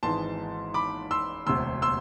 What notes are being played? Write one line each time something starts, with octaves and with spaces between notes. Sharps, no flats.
G#1 G#2 E3 G#3 A5 C6
B5 D6
C6 E6
E1 D2 C3 C6 E6
C6 E6